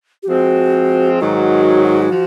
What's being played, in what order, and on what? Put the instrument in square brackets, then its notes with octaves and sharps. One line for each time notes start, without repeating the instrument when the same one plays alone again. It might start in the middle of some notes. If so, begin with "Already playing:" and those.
[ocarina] G4
[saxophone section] F3 G#3 C4 [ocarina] F#4
[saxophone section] G#2 D#3 F#3 [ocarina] F#4
[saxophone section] F3